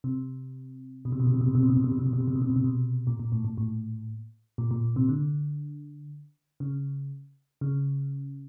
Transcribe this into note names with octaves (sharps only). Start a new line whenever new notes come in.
C3
B2
C3
B2
C3
B2
C3
B2
C3
B2
C3
B2
C3
B2
C3
B2
C3
B2
C3
B2
C3
B2
C3
B2
A#2
A#2
A2
A2
A2
A#2
A#2
C3
D3
C#3
C#3